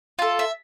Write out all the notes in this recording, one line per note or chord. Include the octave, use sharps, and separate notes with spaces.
F4 A4
E5